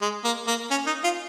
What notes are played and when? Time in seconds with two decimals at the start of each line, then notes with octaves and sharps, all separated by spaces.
0.02 G#3
0.24 A#3
0.47 A#3
0.71 C#4
0.87 D#4
1.04 F4